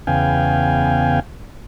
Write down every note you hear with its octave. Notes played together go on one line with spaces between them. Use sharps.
E2 C#3 B3 F5 G5 G#5